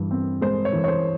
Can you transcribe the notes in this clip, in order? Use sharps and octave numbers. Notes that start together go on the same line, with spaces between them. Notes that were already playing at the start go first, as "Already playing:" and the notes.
Already playing: G2 E3
C4
G#3 C5
C#5
E3
C#5
C5